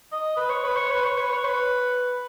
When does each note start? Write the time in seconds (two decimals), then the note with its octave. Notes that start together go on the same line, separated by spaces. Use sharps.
0.12 D#5
0.37 B4
0.50 C#5
0.64 B4
0.76 C#5
0.91 B4
1.04 C#5
1.18 B4
1.31 C#5
1.44 B4